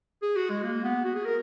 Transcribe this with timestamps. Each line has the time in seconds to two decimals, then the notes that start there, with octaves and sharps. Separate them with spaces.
0.22 G#4
0.36 F#4
0.49 G#3
0.63 A#3
0.84 B3
1.04 F#4
1.15 G#4
1.25 A#4